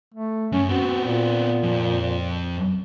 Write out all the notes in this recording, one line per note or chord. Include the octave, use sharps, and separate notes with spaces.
A3
F#2 C#4
B3 C4 F#4
A#2
F2